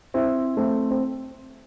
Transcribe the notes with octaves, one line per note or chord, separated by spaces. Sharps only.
C4 E4
A3 C4
C4